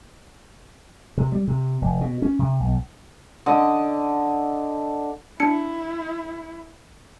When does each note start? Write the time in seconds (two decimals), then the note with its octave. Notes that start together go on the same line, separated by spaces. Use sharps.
1.18 C3
1.32 G3
1.48 C3
1.82 F1
2.01 B2
2.22 C#4
2.39 C3
2.60 B1
3.46 D3 D#5
5.40 D4 E4 C#7